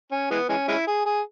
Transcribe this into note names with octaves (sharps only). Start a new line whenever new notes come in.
C#4
E3 G#3 B3
E3 G#3 C#4
G#3 C#4 E4
G#4
G#4